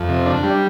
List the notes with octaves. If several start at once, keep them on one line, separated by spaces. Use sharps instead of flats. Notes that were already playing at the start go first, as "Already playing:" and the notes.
Already playing: F2
C3
D4
G3